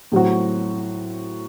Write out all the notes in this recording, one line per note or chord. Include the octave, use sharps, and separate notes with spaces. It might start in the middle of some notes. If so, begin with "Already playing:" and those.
A2 F#3 C4 F#4